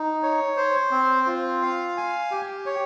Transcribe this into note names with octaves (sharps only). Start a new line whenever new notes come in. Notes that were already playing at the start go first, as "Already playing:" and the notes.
Already playing: D#4
C#5
C5
C4
F4
F5
G#5
G4
C#5